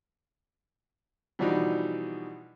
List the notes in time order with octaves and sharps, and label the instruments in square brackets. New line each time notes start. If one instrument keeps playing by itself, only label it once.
[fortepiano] B2 E3 F3 G3 D4 D#4